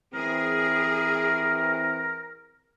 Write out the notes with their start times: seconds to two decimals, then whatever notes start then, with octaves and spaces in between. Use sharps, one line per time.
0.14 E3 C4 G#4 A#4